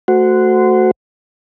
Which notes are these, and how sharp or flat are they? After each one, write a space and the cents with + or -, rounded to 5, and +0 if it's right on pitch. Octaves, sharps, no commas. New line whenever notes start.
A3 +0 F#4 +0 C5 -25